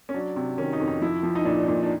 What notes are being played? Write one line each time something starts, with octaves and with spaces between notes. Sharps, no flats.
C#4
F#3 D4
C3
D#3 C#4
D#4
F2
D#4
F3 E4
F3
D#4
A#2 D4
A#2
D4